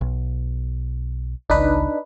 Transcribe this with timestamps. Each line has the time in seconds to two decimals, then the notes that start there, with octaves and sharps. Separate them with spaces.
0.01 B1
1.50 G#1 C#2 D4 D#4 B4